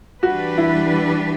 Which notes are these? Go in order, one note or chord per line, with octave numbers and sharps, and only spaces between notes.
E3 G3 D4 F#4 G4 B4
E4